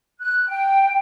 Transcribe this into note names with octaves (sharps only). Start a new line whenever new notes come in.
F#6
G5